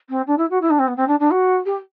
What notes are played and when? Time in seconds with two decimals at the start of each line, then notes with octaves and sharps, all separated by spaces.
0.09 C4
0.27 D4
0.38 E4
0.50 F#4
0.61 E4
0.70 D4
0.79 C4
0.87 B3
0.96 C4
1.07 D4
1.19 D4
1.31 F#4
1.65 G4